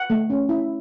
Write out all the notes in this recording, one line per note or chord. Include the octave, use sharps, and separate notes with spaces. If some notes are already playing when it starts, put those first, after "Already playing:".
Already playing: F#5
A3
C#4
E4